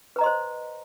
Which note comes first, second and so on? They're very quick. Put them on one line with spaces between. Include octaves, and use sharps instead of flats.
B4 A#5 D#5 C6 C5